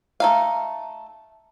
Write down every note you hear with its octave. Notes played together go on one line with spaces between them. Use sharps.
A3 D#4 F5